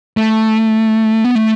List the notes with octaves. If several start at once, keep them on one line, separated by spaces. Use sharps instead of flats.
A3
B3
A3